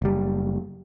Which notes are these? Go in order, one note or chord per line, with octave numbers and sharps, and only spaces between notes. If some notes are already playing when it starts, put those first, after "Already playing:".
F#1 G3